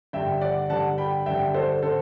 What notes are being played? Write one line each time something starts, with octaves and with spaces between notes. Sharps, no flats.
G2 D3 E5 G5
D5 F#5
G2 D3 F#5 A5
G5 B5
G2 D3 E5 G5
A4 C5
D3 A4 C5